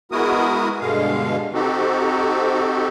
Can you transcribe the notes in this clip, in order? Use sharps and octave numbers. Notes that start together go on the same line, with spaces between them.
G#3 B3 E4 F#4 A#4 D#6
G2 B2 D3 G#3 F5
C4 D#4 F#4 G4 A4